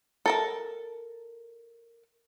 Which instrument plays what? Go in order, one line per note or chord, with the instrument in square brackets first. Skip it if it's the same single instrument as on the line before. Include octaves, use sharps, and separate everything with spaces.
[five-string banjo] A4 A#4 A5